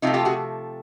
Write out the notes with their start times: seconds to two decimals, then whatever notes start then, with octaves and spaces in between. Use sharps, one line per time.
0.02 C3 F3 A3 D#4 F4
0.14 F4 G4
0.25 F#4 G#4